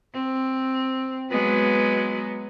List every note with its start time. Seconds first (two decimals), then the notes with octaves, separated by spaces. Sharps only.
0.14 C4
1.31 F#3 G#3 B3